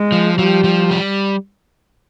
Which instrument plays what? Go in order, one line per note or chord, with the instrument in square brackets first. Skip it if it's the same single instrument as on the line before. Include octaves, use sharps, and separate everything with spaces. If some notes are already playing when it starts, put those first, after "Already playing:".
Already playing: [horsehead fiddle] G#3
[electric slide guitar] F3
[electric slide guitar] F3 [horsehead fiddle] G3
[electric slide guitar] F3
G3